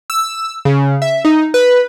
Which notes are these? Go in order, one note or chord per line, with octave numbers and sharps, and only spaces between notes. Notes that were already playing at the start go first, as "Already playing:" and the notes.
E6
C#3
E5
D#4
B4